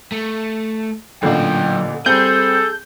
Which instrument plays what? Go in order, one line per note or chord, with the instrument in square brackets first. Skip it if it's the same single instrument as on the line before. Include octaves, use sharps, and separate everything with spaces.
[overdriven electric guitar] A3
[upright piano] A1 A#2 D3 [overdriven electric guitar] F#3 F5 [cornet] G5
[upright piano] G3 C4 [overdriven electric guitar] G#4 [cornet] A4 [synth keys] G6